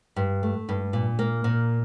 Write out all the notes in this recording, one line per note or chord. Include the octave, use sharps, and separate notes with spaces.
G2
A3
G2
A#2
A#3
A#2